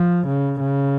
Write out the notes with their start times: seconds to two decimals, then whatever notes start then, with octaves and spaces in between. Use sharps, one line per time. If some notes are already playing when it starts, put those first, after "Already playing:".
Already playing: F3
0.27 C#3
0.60 C#3